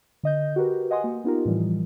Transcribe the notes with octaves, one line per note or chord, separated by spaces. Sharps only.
D3 D#5 G6
F#4 G4 A#4 B4
D#5 F#5 G#5 C6 D#6
A#3 F#4
B3 D#4 F4 G4 A#4
A2 E3 F3 G3